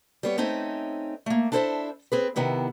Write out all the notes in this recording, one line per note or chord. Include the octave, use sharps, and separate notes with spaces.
G3 B3 C#5
A3 C4 C#4 D#4 E5
A3 A#3
D4 E4 A4 C5 C#5 E5
C4 G#4 B4
C3 D#3 B3 E4